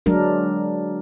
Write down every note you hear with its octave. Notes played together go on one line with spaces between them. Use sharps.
F#3 G#3 D4 A#4